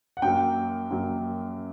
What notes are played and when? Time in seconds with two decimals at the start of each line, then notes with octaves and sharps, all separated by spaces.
0.17 F#5
0.22 F#2 F#3 A#3 G5
0.90 F#2 F#3 A#3